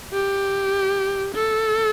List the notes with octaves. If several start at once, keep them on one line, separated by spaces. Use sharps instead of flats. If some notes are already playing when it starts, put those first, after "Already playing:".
G4
A4